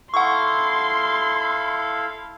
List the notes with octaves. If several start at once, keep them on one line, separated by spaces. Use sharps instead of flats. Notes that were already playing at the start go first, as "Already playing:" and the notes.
E4 A4 F5 F#5 C6 C#6